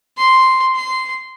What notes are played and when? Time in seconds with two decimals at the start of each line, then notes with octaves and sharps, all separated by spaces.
0.17 C6
0.75 C6